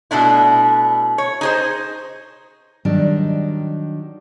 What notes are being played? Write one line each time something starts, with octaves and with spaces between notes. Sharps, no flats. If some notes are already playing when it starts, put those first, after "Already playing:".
B2 A3 D4 E4
C#5
D#4 G#4 C5
D#3 F#3 G3 D4 D#4